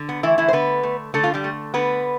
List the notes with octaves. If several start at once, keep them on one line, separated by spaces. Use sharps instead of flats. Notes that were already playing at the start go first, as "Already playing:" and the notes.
Already playing: D3
B3
E3 A3 E4
E3 E4
C5
D3 B3 B4
A3
D3 A3 A4
F4
G3 G4
A3
D3 B3 B4